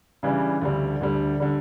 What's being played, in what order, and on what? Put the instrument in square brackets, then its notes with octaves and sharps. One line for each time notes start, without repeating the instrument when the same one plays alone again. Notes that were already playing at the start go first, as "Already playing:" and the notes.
[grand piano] C#3 E3 G3 D4
D2 D3 G3
D2 D3 G3
D3 G3